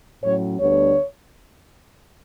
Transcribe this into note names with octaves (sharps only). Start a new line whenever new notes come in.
A2 F#3 C#4 C#5
D2 D3 G3 B3 D4 C#5